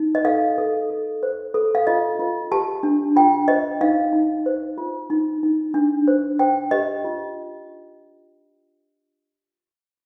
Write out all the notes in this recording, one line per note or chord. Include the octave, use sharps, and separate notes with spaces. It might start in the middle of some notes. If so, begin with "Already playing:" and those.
Already playing: D#4
D#5
A4 F5
A4
A4
C5
A4
F5
F4 D#5
F4
G4 A5
D4
F4 G5
C5 D#5
D#4 F5
D#4
C5
F4
D#4
D#4
D4
C5
C5 G5
G4 D#5
F4